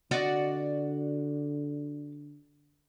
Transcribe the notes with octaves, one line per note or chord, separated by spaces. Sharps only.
D3 F#4 D5 D#5